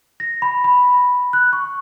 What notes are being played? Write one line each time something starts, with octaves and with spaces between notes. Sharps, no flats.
A#6
B5
B5
F#6
C#6